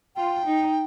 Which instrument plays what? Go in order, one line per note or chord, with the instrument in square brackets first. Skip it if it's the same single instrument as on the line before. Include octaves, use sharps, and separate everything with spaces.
[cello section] F4 [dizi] G5
[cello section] D#4